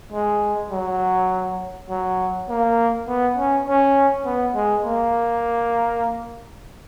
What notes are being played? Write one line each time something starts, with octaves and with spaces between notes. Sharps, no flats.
G#3
F#3
F#3
A#3
B3
C#4
C#4
B3
G#3
A#3